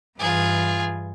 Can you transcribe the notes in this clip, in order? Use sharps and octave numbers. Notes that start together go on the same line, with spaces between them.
G2 E3 F4 G#4